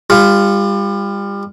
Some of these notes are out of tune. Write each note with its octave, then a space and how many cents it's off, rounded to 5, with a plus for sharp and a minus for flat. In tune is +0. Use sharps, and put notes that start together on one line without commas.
G3 +30 F4 +0